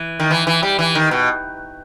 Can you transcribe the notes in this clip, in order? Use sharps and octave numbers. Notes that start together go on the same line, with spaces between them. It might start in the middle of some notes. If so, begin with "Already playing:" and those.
Already playing: E3
D#3
E3
E3
G3
E3
D#3
B2